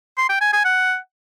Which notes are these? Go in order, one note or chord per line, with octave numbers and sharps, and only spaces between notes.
C6
G5
G#5
G#5
F#5